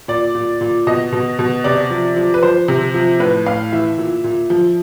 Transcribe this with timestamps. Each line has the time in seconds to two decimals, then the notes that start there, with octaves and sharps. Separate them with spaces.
0.08 A#2 D5
0.35 A#2
0.61 A#2
0.87 B2 D#5
1.12 B2
1.39 B2
1.64 C3 D5
1.90 F3
2.16 F3
2.34 B4
2.43 F3 C5
2.68 C3
2.94 F3
3.20 A2 B4
3.46 A2 F5
3.72 E3 E5
3.98 A#2
4.24 A#2
4.50 F3